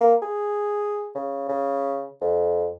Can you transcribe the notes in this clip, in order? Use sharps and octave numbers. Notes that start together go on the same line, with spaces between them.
A#3
G#4
C#3
C#3
F2